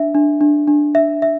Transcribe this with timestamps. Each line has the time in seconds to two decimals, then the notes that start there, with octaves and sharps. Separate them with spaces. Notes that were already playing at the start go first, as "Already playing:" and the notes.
Already playing: D4 E5
0.15 D4
0.41 D4
0.68 D4
0.95 E5
1.22 E5